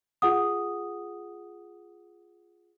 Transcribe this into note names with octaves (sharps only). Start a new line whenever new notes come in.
F4 G#4 F#5 D#6